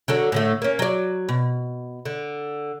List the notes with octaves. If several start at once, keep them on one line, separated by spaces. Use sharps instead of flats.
D3 F#3 A4
A2 D3 A3
A#3 C#4
F#3 D5
B2
D3